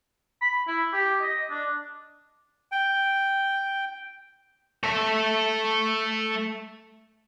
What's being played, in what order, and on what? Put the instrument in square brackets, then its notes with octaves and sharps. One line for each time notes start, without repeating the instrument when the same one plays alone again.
[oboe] B5
E4
G4
D#5
D4
[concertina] G5
[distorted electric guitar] A3 E5